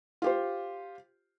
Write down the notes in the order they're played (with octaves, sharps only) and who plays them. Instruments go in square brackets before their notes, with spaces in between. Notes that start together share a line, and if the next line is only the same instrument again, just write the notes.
[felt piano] F4 G4 C5